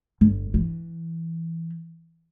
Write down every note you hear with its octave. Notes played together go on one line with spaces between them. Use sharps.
G1
E3